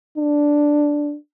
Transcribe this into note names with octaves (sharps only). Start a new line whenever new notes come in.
D4